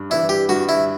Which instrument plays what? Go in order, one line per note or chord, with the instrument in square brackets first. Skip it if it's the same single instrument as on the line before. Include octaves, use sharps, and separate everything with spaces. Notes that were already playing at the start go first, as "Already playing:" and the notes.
Already playing: [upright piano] G2
[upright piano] E3 B3 D4 [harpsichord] E4
[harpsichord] G4
[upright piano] G2 [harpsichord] F#4
[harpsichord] E4